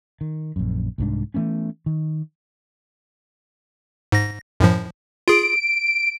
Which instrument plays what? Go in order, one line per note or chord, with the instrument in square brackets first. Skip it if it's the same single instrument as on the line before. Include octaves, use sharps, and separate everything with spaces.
[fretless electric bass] D#3
A#1 F#2
C2 G#2 D4
E3 A3 B3 C#4
D#3
[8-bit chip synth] G#2 A#6
F#2 A2 F3
[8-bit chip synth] F4 G#4 [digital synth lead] D7